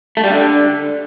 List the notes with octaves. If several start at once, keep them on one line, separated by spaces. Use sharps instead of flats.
A3
G3
D3